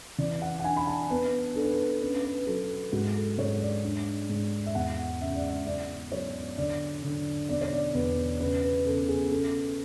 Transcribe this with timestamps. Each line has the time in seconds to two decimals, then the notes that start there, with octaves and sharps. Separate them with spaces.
0.18 E3 D5
0.42 F#5
0.59 F#5
0.64 D4 G#5
0.77 B5
0.87 A5
1.10 B3 B4
1.55 D4 A4
1.64 B4
1.73 A4
2.01 C#4 B4
2.24 B4
2.47 F#3 A4
2.92 G#2 F#4
3.15 A4
3.38 G#2 C#5
3.61 D5
3.83 D4
4.29 G#2
4.66 E5
4.75 E2 F#5
5.21 C#3 E5
5.35 D5
5.49 E5
5.66 F#2 D5
6.12 F#3 C#5
6.57 D3 D5
7.03 D3
7.49 B2 D5
7.61 C#5
7.73 D5
7.94 E2 B4
8.40 C#3 B4
8.63 B4
8.86 C#3 A4
9.09 G#4
9.31 C#3 A4